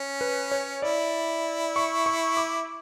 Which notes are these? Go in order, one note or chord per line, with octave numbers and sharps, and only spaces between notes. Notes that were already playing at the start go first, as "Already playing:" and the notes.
Already playing: C#4
B4
C#5
E4 D5
C#6
C#6
D6